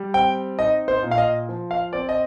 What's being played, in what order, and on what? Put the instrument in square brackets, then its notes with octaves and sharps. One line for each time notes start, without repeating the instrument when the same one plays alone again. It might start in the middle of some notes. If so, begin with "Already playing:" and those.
Already playing: [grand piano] G3
C4 G5
D#4 D#5
C5
A#2
F5
D#5
F3
F5
C4 D5
D#5